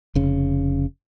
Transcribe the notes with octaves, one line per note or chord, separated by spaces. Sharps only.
F1 C#3